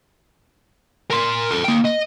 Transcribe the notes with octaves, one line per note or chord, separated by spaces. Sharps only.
A#4 C6
A4 C5
A#3 G5
D#5